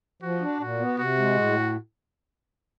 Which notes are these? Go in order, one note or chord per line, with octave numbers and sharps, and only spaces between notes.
F3 F#4
D4
A#2 F#4
B3
C3 F#4
G#3
A2